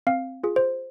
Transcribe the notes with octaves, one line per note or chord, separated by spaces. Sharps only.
C4 F5
F4 G#4
C5